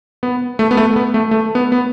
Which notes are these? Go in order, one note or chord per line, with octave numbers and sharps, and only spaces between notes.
B3
A3
B3
A3
B3
A3
A3
B3
B3